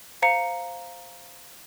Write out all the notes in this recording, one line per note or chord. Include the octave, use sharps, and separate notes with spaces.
C5 F5 A#5 C#7